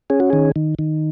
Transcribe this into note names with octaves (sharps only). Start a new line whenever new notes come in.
C#4 G#4
F#4
D#3 G#4
D#3
D#3